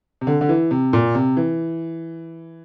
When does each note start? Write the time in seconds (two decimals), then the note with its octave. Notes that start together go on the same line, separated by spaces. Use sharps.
0.21 C3
0.27 D3
0.41 D3
0.49 E3
0.71 C3
0.93 A#2
1.15 C3
1.37 E3